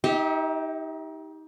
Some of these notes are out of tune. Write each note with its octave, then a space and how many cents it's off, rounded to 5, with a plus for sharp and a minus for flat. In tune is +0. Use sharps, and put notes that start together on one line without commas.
D#4 +25 G4 +0 E5 -35